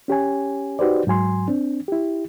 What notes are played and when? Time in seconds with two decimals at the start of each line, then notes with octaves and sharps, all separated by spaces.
0.08 C#4 G4 C#5 G#5
0.79 D#4 F#4 G4 B4 C5 D5
1.07 G#2 F#3 G#5 C6
1.48 C4 D4
1.88 E4 G4